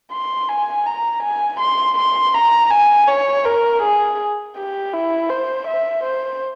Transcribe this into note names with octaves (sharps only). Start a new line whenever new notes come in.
C6
G#5
A#5
G#5
C6
C6
A#5
G#5
C#5
A#4
G#4
G4
E4
C5
E5
C5